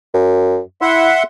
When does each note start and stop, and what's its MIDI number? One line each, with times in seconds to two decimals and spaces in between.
0.14 0.59 42
0.82 1.09 64
0.82 1.23 76
0.82 1.23 78
0.82 1.23 84